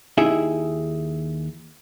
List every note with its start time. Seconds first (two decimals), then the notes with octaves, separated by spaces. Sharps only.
0.18 D#2 D#4 E4 G#4 E5